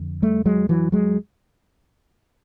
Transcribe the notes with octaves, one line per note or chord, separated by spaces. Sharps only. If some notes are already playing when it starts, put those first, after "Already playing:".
Already playing: F2 D3
G3 A3
F#3 G#3
E3 F#3
F#3 G#3